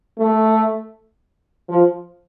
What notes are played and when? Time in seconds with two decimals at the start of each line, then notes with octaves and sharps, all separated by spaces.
0.19 A3
1.69 F3